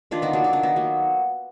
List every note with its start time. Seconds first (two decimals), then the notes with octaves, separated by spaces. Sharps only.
0.11 D#3 D4 F4
0.22 B3 D#4
0.33 F#3 A#3 D4
0.44 D#4
0.53 D#3 D4
0.63 B3 D#4
0.76 F#3 A#3